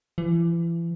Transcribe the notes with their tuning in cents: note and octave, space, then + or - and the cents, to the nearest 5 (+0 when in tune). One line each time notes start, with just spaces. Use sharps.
E3 +35